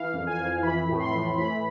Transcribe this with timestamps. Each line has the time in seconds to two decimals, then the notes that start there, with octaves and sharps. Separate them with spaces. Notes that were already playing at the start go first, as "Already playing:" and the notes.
Already playing: E3 F5
0.14 F2
0.27 G#5
0.38 F2
0.63 E3 B5
0.88 A2
1.00 C6
1.13 A2
1.37 E3 B5